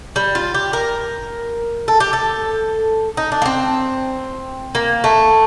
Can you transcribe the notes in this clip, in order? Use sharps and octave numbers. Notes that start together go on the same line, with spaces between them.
G3
F4
G4
A#4
A4
G4
A4
D#4
D4
A#3
C4
A#3
A3